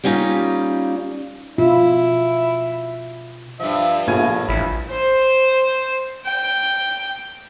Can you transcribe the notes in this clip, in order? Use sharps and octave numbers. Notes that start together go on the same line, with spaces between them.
G3 A#3 C#4 D#4 F4
B2 E4 F4
G2 F3 E5
A#1 A2 G#6 D#7
A1 E4
C5
G5